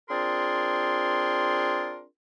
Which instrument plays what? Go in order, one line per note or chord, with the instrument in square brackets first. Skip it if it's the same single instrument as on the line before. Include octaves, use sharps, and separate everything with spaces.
[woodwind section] C4 D4 F4 G#4 A#4 C6